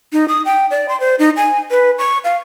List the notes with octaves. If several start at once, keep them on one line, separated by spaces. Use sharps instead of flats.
D#4
D#6
G5
D5
C6
C5
D#4
G#5
B4
C#6
F5